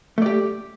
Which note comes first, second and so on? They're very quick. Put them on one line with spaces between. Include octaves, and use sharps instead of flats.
A3 D5 G4